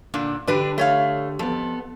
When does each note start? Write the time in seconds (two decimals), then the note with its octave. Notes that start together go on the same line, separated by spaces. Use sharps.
0.14 A#2 D3 D4
0.47 D3 D4 G4 B4 D5
0.78 A3 C#5 F5
1.39 F2 B3 A4